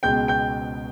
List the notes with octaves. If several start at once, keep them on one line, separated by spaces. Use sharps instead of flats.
C#2 B2 G#3 G5 G6
G5 G6